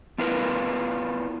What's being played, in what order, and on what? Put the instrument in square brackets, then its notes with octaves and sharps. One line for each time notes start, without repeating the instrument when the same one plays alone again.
[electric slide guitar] B3 E4 F4 A#4 B4